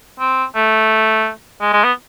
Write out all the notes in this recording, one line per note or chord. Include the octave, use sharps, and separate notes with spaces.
C4
A3
G#3
G#3
B3